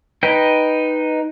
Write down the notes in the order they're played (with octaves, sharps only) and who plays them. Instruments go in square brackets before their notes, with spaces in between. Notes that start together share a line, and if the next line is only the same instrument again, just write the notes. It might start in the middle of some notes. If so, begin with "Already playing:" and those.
[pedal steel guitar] D#4 B4 G5